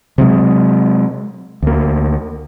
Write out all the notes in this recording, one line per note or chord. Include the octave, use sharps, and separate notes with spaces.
C3 F#3 G#3
D2 A#3